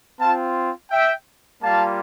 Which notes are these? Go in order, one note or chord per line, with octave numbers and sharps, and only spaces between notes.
C4 F4 F5 A5
E5 G5
G3 A#3 F4 F5 A5